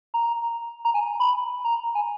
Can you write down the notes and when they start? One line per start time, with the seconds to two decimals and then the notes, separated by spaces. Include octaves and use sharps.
0.14 A#5
0.85 A#5
0.94 G#5
1.04 A#5
1.20 B5
1.65 A#5
1.95 G#5